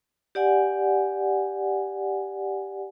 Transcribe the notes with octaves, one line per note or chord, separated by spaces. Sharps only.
G4 D5 F#5 G#5